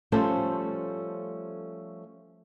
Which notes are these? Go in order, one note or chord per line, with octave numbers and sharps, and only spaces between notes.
F3 G3 A3 C#4 A4 C5